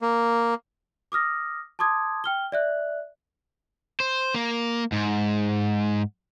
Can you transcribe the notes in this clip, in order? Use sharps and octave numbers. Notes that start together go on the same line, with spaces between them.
A#3
D6 D#6 F6 A#6
A5 C6 D6 D#6 G#6
G5 F6 G7
D5 E5 F#6
C5
A#3
G#2